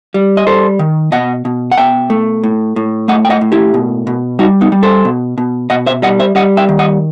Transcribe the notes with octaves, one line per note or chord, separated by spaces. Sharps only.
G3
D#5
G3 A4 C5
D#3
B2 D#5 F#5
B2
F#5
B2 E5 G5
A3
A2
A2
A3 D#5 F#5
G5
D#5 F#5
A2
E4 G4
B2
B2
G3 D#4 F#4
B3 D#4
G3
A4 C5
B2
B2
B2 D#5 F#5
C5 E5
G3 D#5 F#5
C5 E5
G3 D#5 F#5
E5 G5
D#3
D#5 F#5